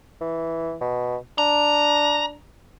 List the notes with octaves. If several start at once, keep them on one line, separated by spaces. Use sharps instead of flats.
E3
B2
D4 A#5